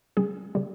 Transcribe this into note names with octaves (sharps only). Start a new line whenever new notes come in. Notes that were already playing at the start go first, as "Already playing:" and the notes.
C#3 G3 G#4
C#3 G3